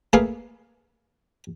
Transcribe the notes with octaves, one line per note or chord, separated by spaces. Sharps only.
A3 A#3 G#4 B4 F5